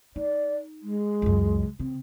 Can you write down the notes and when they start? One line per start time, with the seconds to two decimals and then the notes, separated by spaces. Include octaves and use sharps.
0.16 D#4 D5
0.82 G#3
1.22 C#2 F#2
1.80 C#3 C4